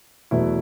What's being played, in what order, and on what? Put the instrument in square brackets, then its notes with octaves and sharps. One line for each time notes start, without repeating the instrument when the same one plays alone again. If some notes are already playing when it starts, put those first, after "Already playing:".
[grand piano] E2 B2 F#3 A3 E4